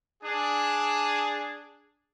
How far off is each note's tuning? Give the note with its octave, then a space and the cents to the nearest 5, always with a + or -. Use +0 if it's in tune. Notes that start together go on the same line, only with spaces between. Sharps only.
D4 +0 G#4 +0